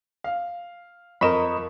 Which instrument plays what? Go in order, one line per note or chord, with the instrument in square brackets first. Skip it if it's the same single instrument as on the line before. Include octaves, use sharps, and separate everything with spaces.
[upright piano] F5
[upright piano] F2 C#6 E7 [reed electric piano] A#4 D#5 B5